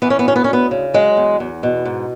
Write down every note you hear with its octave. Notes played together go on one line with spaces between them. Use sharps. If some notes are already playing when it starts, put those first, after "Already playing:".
E3 B3
C#4
B3
D2 C#4
B3
C#4
D2
B3
C#3
F#3 G#3
E2
E2
B2
G#2